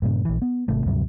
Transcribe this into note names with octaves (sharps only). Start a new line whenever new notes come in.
G2 A#2 C#3
A#1 E3
B3
G#1 C3 A3
D2 G2 C3 F#3